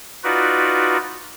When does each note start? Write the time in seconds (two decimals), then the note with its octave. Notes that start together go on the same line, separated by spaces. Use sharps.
0.24 D#4 F4 F#4 B4 D5